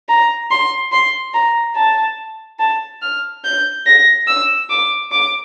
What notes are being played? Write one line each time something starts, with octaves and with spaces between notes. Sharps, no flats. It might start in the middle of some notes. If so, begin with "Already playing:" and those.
A#5
C6
C6
A#5
A5
A5
F6
G6
A#6
E6
D6
D6